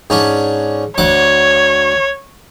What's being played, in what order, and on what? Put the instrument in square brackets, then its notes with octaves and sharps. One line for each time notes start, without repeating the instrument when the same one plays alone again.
[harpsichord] G#2 C#4 D4
[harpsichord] D2 F#5 D6 [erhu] C#5